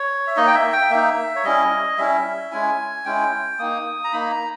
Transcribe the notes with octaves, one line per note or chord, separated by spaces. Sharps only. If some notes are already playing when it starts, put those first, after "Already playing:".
Already playing: C#5
E5
A#3 D#4 D#5
G5
E5
G5
A#3 D#4 E5
C#5
G3 C#4 E4 D#5
G3 C#4 E4 E5
G#3 C#4 E4 G#5
G#3 C#4 E4 G5
A#3 D#4 D#6
A#5
A#3 D#4 B5
A#5